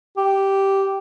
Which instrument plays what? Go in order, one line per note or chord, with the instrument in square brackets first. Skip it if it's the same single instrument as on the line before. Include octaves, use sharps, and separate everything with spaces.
[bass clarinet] G4